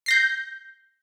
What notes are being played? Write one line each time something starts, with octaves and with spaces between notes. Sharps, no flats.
G6 A#6 C7